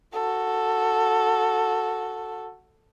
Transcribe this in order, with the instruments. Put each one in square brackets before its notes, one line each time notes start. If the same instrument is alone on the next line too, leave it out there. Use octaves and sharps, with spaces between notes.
[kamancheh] F#4 A4